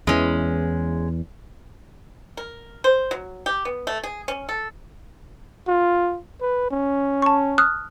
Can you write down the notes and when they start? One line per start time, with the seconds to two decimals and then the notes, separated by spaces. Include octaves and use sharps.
0.07 E2 E3 G#3 C#4
2.37 A#4
2.84 C5
3.11 F#3
3.46 G4
3.65 B3
3.87 A3
4.04 G#4
4.28 C#4
4.49 A4
5.68 F4
6.41 B4
6.71 C#4
7.22 A5 C#6
7.58 D#6 F6 F#6